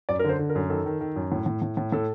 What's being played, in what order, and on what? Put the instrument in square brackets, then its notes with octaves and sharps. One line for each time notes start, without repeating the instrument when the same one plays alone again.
[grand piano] F#2 D5
A#4
D3 C5
D3
A#4
F#2
D#3 A4
D#3
D#3
F#2
A2
A2
A2
A2
A2 A4